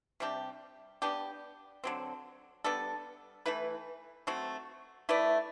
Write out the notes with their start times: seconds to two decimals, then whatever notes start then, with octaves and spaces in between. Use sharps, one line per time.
0.20 C3 G3 D4 G4
1.02 B3 D4 G4
1.84 D3 F#3 C4
2.64 G3 B3 D4 A4
3.46 E3 A3 E4 B4
4.27 F#3 A3 C4 F#4
5.09 A3 E4 B4 D5